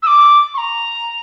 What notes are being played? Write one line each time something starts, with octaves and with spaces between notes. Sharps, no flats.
E6
D6
C#6
A#5